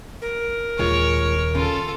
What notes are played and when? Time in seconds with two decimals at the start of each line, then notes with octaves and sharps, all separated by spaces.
0.22 A#4
0.79 D#1 D#2 D#3 G#3 F4 C#5
1.55 C#3 C#4 F4 A4